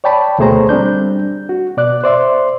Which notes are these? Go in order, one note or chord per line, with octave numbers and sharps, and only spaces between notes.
C#5 D5 G5 A5 B5
D2 B2 A3 G#4 C5 A#5
G3 C4 D4 G6
F#4
B2 D5 F#6
C5 D5 E5 C6